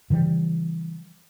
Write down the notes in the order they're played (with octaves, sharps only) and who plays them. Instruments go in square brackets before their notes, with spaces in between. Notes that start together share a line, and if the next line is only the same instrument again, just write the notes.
[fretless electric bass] C#3 E3 F3 G3